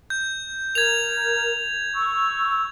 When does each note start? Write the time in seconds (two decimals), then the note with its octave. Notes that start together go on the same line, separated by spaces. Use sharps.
0.10 G6
0.75 A#4 G#6 F7
1.95 C#6 E6